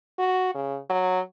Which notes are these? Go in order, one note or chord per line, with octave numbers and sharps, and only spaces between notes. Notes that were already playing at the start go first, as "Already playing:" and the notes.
F#4
C#3
F#3